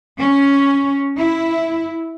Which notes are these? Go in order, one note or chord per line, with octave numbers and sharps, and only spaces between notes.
C#4
E4